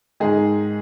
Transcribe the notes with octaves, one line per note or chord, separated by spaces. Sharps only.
G#2 D#3 G#3 G#4